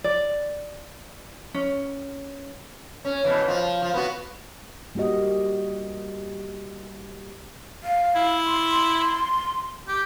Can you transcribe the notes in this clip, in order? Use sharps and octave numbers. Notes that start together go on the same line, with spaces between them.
D5
C#4
C#4
B2 E3
F3
F3
B3 F#4
G3 A#3 F#4 G4 D#5
F5
E4
C6
G4